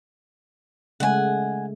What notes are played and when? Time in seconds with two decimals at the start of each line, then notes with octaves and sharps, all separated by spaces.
1.00 C#3 G#3 A3 F#5 G#5